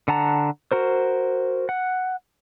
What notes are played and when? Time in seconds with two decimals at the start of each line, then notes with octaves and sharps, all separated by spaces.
0.08 D3 F#5 A5 A#5
0.72 F#4 A#4 C5
1.69 F#5